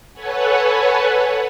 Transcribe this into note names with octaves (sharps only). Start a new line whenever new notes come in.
A4 B4 C#5 F#5 G#5